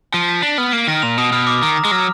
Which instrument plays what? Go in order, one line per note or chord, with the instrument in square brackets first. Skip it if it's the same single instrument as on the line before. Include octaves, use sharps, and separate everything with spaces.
[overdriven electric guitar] F3 [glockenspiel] D7
[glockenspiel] B6
[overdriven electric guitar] D4 [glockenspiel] F#7
[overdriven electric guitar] B3 [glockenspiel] F6
[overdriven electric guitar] A#3 [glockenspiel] D7
[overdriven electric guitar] D#3 [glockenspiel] A#6
[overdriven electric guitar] A#2 [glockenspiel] F7
[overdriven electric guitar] B2 [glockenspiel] D#6
[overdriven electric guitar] B2 [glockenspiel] F6
[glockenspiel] D6
[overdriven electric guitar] D#3 [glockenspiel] A#5
[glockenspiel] A#5
[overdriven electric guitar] G#3
[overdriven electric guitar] F#3 [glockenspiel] F6